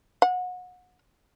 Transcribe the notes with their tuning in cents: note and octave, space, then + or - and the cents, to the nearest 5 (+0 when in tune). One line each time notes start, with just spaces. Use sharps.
F#5 -30